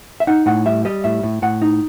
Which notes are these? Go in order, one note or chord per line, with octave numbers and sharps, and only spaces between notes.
E5
D#4 F#5
A2 F#5
G3 E5
G3 D#5
A2 E5
A2
A2 F#5
D#4